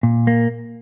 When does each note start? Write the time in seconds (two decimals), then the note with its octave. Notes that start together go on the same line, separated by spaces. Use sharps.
0.03 A#2
0.27 A#3